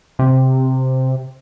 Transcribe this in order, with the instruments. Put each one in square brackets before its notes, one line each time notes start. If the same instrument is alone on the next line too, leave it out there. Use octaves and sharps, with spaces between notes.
[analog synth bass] C3